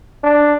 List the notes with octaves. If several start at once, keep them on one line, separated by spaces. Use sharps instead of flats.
D4